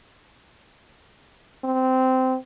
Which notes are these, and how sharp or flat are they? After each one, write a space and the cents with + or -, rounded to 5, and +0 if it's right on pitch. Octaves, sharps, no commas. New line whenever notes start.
C4 -15